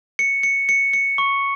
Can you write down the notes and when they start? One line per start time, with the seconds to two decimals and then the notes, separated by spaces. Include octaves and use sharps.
0.19 C#7
0.43 C#7
0.69 C#7
0.93 C#7
1.18 C#6